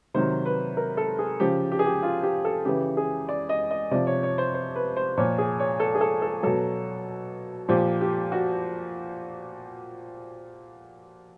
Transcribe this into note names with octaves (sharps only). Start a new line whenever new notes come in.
C3 D#3 F#3 C5
B4
A#4
A4
G#4
C#3 F3 G4
G4
G#4
G4
F4
G4
A4
C#3 E3 G4
G#4
D5
D#5
D#5
C3 F3 D5
C#5
C#5
C5
C5
B4
C5
A#2 F3 C#5
G#4
C#5
A4
G#4
A4
A4
B2 F#3 A4
A#2 F3 G4
G4
F#4